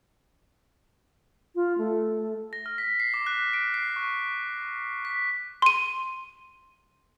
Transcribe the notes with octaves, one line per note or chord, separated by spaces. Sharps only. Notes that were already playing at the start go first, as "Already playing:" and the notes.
F4
A3
A#6
F6
B6
C7
D6
F#6
D7
C7
C#6
B6
C6 D#7